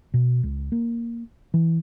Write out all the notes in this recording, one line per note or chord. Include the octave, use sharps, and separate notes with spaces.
B2
C#2
A#3
E3